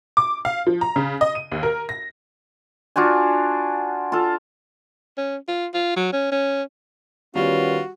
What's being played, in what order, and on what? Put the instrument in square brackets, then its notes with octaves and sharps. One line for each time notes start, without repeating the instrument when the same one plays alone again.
[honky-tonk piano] D6
F5
F3
A#5
C#3
D#5
D#7
D#2
A#4
A#6
[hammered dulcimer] D4 F4 F#4 G#5
F4 A4
[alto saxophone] C#4
F4
F4
F#3
C#4
C#4
[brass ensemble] D#3 B3 C#4 [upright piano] G3 [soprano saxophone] F4 [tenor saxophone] F#4